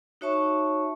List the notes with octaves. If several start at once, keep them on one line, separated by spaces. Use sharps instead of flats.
D#4 F#4 C#5 E5 A5 C#6